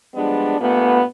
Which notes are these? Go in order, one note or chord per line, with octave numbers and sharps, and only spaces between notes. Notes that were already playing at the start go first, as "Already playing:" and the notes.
F3 G3 G#3 B3 D4
G2 A#2 A3 B3